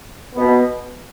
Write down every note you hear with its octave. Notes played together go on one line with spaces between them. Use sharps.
B2 B3